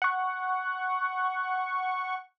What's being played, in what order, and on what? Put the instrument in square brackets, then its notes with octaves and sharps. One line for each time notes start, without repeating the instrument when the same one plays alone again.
[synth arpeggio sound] F#5 C#6